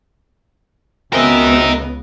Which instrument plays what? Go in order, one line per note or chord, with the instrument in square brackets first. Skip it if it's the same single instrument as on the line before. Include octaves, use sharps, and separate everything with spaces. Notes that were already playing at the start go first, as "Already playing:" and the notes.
[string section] C#2 C#3 B3 [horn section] F#2 C4 E5 [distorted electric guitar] A#4 D#5